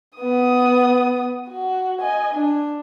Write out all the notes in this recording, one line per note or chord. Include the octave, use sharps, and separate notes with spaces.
B3 D#6
F#4
D#5 G#5
D4